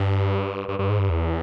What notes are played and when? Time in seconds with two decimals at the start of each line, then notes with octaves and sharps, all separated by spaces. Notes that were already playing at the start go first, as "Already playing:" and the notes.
Already playing: G2
0.68 G2
0.79 G2
0.89 G#2
0.99 G2
1.10 E2